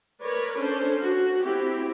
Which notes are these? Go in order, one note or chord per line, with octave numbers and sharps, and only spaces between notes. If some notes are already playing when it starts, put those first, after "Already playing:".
A#4 B4 C#5 D5
C#4 D4 A4 C5
F#4
C4 E4 G4